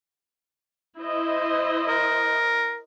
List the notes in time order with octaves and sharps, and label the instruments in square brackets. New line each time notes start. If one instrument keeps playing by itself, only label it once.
[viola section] E4 C5 D#5
[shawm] A#4